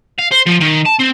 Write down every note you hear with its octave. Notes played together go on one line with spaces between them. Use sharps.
F5
C5
F3
D#3
A5
C4